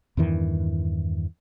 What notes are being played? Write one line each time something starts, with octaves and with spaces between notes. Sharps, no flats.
E2 G2 D#3 E3